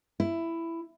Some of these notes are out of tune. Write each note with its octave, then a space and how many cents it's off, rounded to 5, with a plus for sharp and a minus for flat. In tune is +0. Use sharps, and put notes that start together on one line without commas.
E4 +10